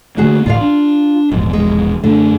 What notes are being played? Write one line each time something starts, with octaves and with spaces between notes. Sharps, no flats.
D3 A3 A#3 C#4 F#4 G#4
A1 D2 A2 F4 D5 F5
D4
E1 A#1 E2 G#2
G#3
F#2 D3 A3